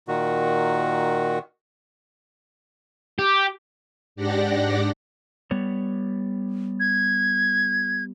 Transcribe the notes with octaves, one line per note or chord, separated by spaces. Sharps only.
A#2 D#3 F#4
G4
G#2 D4 G4 D5 F#5 A#6
G3 B3 C#5
G#6